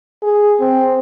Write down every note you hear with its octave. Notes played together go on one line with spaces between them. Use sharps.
G#4
C4